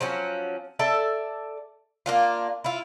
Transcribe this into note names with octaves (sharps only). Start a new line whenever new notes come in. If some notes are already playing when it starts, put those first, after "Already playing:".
F3 F#3 C#4
A4 D5 E5
A#3 D4 F4
E4 F4